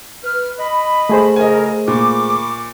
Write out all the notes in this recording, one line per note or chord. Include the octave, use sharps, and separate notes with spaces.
B4 F6
D#5 B5
A3 G#4 C5
F2 C#3 A#4 D#5 G#5
A#2 B5 C#6 D6